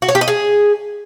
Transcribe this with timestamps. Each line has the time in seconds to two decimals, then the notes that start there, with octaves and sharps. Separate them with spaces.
0.02 F#4
0.09 C#5
0.15 G4
0.21 D#5
0.28 G#4